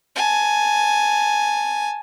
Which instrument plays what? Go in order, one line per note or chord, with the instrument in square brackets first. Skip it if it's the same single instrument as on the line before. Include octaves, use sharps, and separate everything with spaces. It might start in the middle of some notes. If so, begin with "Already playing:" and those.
[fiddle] G#5 A5